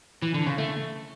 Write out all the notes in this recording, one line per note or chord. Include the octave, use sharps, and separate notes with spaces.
E3
D3
C#3
A3